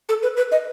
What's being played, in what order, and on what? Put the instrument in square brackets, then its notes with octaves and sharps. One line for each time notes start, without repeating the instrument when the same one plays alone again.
[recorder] A4
B4
B4
D#5